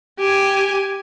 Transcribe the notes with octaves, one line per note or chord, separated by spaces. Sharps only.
G4 G#5